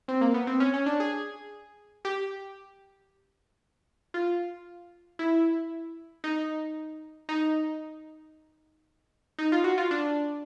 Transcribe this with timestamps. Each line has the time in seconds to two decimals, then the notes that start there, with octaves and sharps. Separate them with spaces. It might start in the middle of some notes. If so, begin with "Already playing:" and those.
0.08 C4
0.21 A#3
0.34 B3
0.47 C4
0.60 C#4
0.74 C#4
0.86 D4
1.00 G#4
2.05 G4
4.14 F4
5.19 E4
6.24 D#4
7.29 D#4
9.39 D#4
9.52 F4
9.64 F#4
9.78 F4
9.91 D4